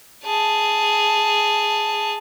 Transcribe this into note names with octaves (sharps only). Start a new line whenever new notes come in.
G#4 A5